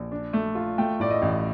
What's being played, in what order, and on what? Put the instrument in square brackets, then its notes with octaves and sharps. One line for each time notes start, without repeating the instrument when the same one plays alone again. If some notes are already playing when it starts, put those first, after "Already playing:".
Already playing: [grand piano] A#1
D4
A3
F4
A3 G5
A2 D5
D#5
A1